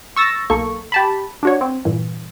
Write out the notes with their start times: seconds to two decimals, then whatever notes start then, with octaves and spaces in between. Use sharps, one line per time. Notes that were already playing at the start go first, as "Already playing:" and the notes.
0.16 C#6 E6 A6 A#6
0.50 B1 A#3 A4 C#6
0.92 G4 A5 B5
1.43 D4 F#4 C#5
1.61 C4
1.85 G2 A#2 E3